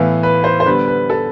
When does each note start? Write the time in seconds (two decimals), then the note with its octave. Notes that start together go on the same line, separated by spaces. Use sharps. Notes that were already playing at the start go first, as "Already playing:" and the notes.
Already playing: A2 E3 B3 F5
0.23 B4
0.44 C5
0.60 C5
0.66 D3 G3 B3 B4
0.88 B4
1.10 A4